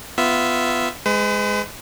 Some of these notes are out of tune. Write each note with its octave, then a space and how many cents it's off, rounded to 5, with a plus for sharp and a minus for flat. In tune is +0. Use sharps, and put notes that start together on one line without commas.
B3 +15 F4 -5 E5 +0
G#3 +0 B4 +40